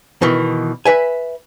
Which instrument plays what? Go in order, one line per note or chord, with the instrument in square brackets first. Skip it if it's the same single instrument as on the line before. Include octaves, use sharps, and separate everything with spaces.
[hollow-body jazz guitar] B2 D#3 E3
B4 E5 G#5